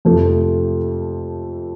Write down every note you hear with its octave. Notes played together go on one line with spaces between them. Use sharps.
F2 C3 F3 A3